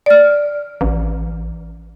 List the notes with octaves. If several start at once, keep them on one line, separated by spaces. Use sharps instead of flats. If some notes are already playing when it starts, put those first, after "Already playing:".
D5 F6
A1